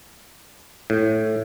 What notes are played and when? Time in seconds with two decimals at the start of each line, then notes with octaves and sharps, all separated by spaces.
0.90 A2